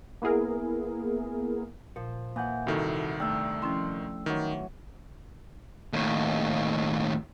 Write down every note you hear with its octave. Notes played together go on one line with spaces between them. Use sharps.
A#3 B3 E4 G#4 A#4
A#2 F3
E3 A#3 F#5 G#5 G6
C2 D#3 E4 F#4 A4
A3 D4 G5 E6
F3 C#4 E4 C6
D#3 E3 F#3
D#2 A2